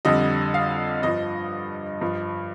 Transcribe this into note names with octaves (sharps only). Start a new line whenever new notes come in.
F2 D3 G3 D#5
F5
G2 F3 D#5
G2 F3